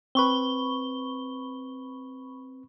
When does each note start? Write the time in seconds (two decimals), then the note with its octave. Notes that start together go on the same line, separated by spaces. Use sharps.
0.15 C4 B4 B5 C#6 G7